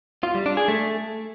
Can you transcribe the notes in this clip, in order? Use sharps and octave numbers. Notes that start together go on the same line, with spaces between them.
F4
G3
D4
G#4
A3